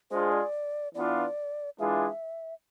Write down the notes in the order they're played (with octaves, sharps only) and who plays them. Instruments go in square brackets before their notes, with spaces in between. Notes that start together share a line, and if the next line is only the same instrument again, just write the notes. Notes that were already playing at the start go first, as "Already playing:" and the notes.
[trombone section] G#3 D4 F4 G#4 [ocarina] C5
[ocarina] D5
[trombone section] E3 B3 D4 F4 [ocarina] D5
[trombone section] E3 G#3 D4 F4 G#4 [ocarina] E5